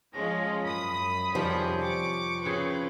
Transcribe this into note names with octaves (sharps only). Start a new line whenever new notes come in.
F3 G#3 C#4 A#5
F#2 B5 D#6
F2 C3 D#3 F3 G3 C#4 G#4
C#6 D6
C#3 C4 C#4 G#4 B4 C5